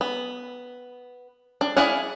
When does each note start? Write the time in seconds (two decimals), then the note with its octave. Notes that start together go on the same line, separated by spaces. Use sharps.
0.01 B3
1.61 D4
1.77 E4 G#4 D5 F5 F#5